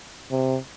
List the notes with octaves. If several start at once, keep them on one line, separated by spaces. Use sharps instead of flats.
C3